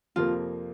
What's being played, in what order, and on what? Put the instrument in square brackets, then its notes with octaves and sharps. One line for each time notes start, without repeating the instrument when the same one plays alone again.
[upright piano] F2 C3 F3 A#3 [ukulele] F4